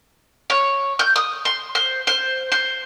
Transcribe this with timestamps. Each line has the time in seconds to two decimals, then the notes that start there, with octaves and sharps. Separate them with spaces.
0.50 C#5
0.99 G6
1.16 D#6
1.45 C6
1.75 C5
2.07 C5
2.52 C5